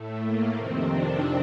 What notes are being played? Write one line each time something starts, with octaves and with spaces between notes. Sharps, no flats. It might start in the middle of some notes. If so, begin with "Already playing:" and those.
Already playing: A2 A3
A#3
F2 C3 D#3 C4
D4